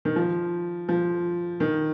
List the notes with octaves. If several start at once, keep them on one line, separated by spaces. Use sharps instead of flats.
D#3
F3
F3
D#3